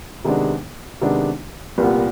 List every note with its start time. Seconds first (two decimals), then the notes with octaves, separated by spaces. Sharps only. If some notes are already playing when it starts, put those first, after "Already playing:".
0.24 C3 D#3 G#3 B3 D4
1.01 C3 D#3 G#3 B3 D4
1.78 C2 A#2 G3 B3